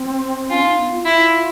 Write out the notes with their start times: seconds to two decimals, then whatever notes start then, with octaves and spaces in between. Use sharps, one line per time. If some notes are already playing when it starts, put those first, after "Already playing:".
Already playing: C4
0.50 C#4 F4
0.63 D#4
0.78 B3
0.92 F4
1.05 E4